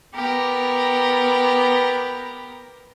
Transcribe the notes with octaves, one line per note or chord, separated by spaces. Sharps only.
B3 G4 A#4